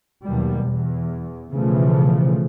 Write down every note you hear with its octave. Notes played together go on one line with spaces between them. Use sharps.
D#2 B2 F#3 G3
E2
B1 C#3 E3 F3 A3